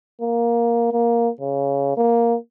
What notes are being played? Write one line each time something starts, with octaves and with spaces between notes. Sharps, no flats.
A#3
A#3
C#3
A#3